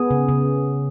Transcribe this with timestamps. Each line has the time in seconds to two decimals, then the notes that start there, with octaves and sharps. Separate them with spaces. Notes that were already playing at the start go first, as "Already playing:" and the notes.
Already playing: B3 G#4
0.11 C#3
0.29 C#3